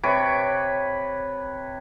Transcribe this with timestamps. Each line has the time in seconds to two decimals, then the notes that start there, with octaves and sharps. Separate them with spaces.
0.03 C3 B4 C#5 D6